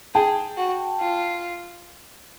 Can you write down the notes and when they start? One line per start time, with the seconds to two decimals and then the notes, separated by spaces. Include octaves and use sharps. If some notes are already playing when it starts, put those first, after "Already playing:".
0.14 G#4 G5 A5
0.57 F#4
1.00 F4